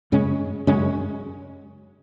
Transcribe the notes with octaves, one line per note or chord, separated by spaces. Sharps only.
F#2 C#3 G#3 C#4
F#2 C#3 G#3 C#4